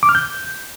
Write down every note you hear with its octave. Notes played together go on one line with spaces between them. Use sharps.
D6
F6
G6